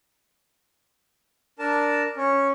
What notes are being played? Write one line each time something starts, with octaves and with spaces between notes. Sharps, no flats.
D4 A#4 A5
C#4